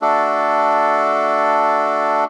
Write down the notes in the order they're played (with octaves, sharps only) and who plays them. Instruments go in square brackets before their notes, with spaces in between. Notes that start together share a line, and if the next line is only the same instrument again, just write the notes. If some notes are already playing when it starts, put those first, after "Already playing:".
[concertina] A3 D4 F#4 A4